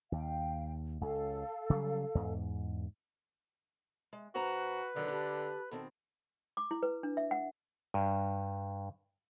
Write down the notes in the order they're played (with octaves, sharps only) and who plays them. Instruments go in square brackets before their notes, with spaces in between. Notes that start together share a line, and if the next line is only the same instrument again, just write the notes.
[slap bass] D#2 [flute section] F5 G5
[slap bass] C#2 [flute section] A4 F5
[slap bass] C#3 F#3 G3
E2 G#2
[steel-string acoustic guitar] G#3
[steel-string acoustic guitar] G2 C5 A#5 [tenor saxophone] F#4 [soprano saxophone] B4
[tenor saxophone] D3 [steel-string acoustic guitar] D#3 F#3
[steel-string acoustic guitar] G4 A4
[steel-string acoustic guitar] B2 D#3 C4 [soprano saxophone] A4
[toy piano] D6
E4
B4
D4
E5
F#5
[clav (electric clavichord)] G2